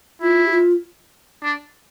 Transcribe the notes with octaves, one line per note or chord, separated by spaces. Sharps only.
E4 F4
G4
F4
D4